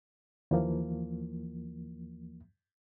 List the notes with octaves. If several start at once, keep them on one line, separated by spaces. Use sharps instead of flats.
D#2 E3 F3 A#3